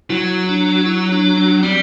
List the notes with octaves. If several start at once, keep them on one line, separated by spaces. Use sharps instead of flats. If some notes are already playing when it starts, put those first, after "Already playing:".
F#3 E4
D4
E4
D4
D4
G3 C4